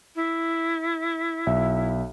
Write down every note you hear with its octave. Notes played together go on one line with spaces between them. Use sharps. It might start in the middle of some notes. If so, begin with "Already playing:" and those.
E4
B1 E5